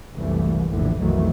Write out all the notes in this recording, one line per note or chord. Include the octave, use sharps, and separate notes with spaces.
F#1 C2 E3 A3
F1 A#1 E2 A2 D3 E3
B1 F2 D#3 E3 F#3 A3